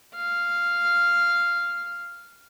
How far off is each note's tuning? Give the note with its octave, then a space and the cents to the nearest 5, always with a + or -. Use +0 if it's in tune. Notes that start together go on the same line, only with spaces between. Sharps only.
F5 -5